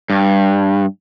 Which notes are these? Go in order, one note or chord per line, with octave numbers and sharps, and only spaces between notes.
G2